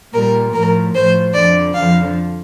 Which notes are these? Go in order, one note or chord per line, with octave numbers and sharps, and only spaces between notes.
A#2 G3 A#4
A2 F3 A#4
A2 F3 C5
F2 D3 F3 D5
F2 D3 F3 F5